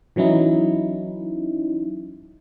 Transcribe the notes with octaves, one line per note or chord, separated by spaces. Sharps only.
E3 F#3 C#4 D#4 E4